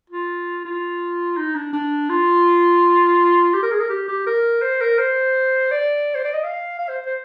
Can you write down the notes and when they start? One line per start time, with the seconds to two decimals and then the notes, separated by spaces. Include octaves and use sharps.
0.10 F4
0.65 F4
1.37 D#4
1.55 D4
1.73 D4
2.09 F4
3.54 G4
3.62 A#4
3.72 G#4
3.80 A#4
3.89 G4
4.08 G4
4.26 A#4
4.62 C5
4.81 A#4
4.99 C5
5.71 D5
6.15 C5
6.25 D5
6.33 D#5
6.44 F5
6.79 F5
6.89 C5
7.06 C5